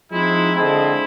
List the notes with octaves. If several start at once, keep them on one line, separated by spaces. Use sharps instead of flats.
F3 G#3 C4 D#4 E4
D3 F3 G#3 C4 E4